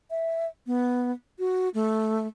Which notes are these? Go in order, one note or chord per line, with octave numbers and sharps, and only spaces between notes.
E5
B3
F#4
A3